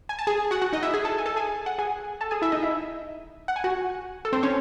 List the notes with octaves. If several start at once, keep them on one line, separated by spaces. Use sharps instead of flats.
G#5
A5
G#4 G#5
F#4 F#5
F#4 F#5
D#4 D#5
E4 E5
G#4 G#5
A4 A5
G#5
A4 A5
G#4 G#5
F#5
G#4 G#5
A4 A5
G#4 G#5
E4 E5
D#4 D#5
E4 E5
F#5
G#5
F#4 F#5
A4
C4 C5
C#4 C#5